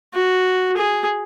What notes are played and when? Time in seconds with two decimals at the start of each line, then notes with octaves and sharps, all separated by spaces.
0.14 F#4
0.77 G#4